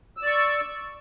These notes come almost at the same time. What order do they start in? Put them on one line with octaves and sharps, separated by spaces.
E6 D5 C#6